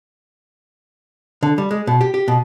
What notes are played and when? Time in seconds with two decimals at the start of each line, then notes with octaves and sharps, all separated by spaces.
1.43 D3
1.58 G3
1.71 G#3
1.87 B2
2.01 G4
2.14 G4
2.28 B2